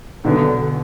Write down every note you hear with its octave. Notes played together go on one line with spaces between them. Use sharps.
B1 B2 D3 B3